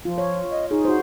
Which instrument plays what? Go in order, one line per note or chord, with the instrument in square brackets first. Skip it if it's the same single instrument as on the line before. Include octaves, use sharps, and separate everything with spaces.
[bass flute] F3 [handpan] F4
[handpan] C#5
[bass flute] D#5
[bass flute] D#4 [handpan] G#4
[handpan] F#4 C5